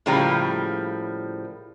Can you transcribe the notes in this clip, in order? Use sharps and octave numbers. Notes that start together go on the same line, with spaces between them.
A2 C#3 F3 G3 A#3 A#5